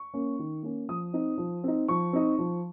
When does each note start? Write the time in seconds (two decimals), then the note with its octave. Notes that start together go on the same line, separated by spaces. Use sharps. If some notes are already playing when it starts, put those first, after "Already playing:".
Already playing: C#6
0.14 A#3 C#4
0.39 D#3
0.63 A#3 C#4
0.89 F3 D#6
1.13 C4 D#4
1.38 F3
1.64 C4 D#4
1.88 F3 C#6
2.13 C4 D#4
2.39 F3